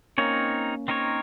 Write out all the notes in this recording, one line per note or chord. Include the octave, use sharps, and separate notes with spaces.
A#3 C4 C#4 D#4 A#4 C#5
C4 D#4 A#4 C#5